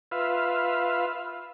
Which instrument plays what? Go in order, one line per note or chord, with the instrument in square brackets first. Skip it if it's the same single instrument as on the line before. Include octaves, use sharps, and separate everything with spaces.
[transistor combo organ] F4 B4 E5 F5